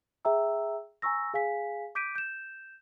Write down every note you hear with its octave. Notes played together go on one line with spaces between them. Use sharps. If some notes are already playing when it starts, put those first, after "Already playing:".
G#4 E5 G5 A#5 E6
G#5 A#5 C#6 E6 A#6
G#4 F5 G#5 B6
D6 G6 B6 D7 D#7
G6 E7